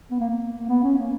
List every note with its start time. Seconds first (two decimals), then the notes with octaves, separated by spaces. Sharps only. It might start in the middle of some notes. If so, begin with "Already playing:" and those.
0.11 B3
0.20 A#3
0.30 A#3
0.69 B3
0.83 C#4
0.98 A#3